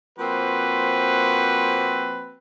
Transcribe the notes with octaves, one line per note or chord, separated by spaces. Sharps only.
F3 A#3 C4 F#4 B4